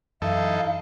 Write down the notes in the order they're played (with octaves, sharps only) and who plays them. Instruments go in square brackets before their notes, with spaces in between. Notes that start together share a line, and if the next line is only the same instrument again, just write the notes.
[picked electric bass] F#2 E3 [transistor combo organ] D#4 E4 A4 [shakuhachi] F5